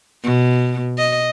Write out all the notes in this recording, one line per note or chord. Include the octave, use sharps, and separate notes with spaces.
B2
D#5